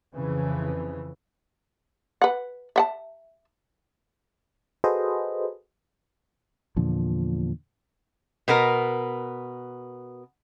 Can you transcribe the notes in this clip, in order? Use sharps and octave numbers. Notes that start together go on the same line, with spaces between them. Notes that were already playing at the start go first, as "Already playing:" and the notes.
F2 C#3 E3
B4 F#5
E5 F#5 A5
F#4 G#4 A4 B4 C5 D#5
E2 A#2 D3 F3
B2 B3 A#4